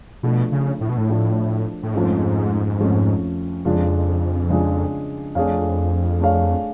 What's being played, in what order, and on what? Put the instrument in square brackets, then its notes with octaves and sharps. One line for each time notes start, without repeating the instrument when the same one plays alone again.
[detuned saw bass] B2 [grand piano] F3 A3 D4
[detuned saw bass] C#3
A2
B2
A2
[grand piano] F3 A3 D4
[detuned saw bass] A2
[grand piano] F2 F3 A3 C#4 [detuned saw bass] G#2
[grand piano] F2 F3 A3 C#4
[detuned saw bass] F2 [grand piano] C#3 G#3 D4 F4 G#4
[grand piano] C#3 G#3 D4 F4 G#4
[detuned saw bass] F2 [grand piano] A3 D4 G#4 C#5 F5
[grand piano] A3 D4 G#4 C#5 F5